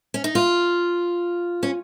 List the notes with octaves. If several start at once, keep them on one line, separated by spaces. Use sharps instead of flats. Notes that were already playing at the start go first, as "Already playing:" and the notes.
C#4
D#4
F4
C#4